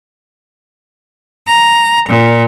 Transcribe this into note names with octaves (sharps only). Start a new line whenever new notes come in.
A#5
A#2